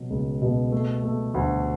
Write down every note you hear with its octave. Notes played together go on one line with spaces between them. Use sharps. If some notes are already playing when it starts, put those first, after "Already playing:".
Already playing: B2 F#3
C#2
B2
A3
A3
D2